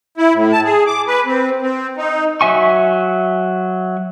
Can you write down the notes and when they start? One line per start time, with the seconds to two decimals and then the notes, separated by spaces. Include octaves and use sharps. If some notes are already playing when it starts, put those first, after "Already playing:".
0.17 E4
0.34 A2
0.52 A5
0.65 G#4
0.87 D6
1.07 B4
1.26 C4
1.62 C4
1.97 D#4
2.41 F#3 E5 G#5 C#6